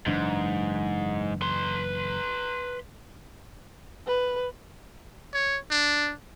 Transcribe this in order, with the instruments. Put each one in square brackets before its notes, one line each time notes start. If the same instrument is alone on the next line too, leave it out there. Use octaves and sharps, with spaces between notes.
[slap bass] F#1 E3 D4 [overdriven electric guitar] G#2
[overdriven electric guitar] B4 C6
[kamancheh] B4
[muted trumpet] C#5
D4